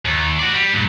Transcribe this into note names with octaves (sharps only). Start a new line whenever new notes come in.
D#2
F#4 D5
G3
G2 A#2